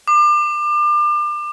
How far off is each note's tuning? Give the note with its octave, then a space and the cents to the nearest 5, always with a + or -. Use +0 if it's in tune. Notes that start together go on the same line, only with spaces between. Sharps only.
D6 +30